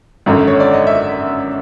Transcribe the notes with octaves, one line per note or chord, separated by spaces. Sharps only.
G#1 F#2 D3
C#5
D5
D#5
E5